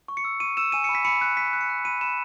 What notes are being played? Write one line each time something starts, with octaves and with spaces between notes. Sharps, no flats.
C#6
C#7
E6
C#6 D#7
E6 E7
G#5 D#7
B5 C#7
B6
B5 C#7
F#6
F#6 B6
F#6
C#7
F#6
B5 D#7
B5 E7